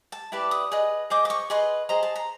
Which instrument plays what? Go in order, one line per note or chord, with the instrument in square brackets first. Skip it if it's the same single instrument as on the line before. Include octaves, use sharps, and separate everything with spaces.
[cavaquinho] A5
E4 G4 B4 D5 A5
D#6
G#4 B4 D#5
G#4 C5 D#5 D6
D6
C#6
G#4 B4 D#5 C6
G#4 C5 D#5 A#5
A5
A#5